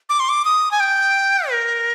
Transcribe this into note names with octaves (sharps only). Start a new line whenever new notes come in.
D6
C6
D6
D#6
G#5
G5
A#4